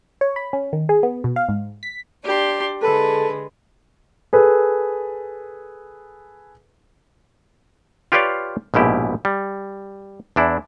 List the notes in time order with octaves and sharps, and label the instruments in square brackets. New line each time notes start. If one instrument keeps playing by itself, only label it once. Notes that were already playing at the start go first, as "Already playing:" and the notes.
[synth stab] C#5
B5
C#4
D#3
G#4
B3
B2
F5
G#2
B6
[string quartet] D4 D5 [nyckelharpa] G4 C6
[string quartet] D3 G#3 G#4 [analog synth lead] A4 [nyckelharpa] B4
[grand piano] G#4 A4 B4
[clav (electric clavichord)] F4 G4 B4 C#5 D5 F5
A#1 G#2 B2 E4 G4
G3
E2 D4 E4